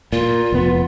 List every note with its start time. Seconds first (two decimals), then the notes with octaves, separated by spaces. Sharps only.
0.13 A#2 F4
0.52 F1 B3